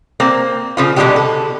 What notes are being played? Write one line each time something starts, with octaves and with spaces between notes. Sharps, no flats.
A#3 C4
C#3 F3 F4
B2 D3 F3 G3 G#3 G4
A4